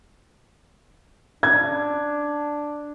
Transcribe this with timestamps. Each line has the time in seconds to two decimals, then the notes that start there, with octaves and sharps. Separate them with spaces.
1.43 D4 G#6